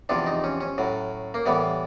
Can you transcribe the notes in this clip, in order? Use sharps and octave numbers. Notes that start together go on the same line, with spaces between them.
E2 C3 F3 D4
D#4
C#4
C#4
A2 F#3
A#3
A2 E3 G3 B3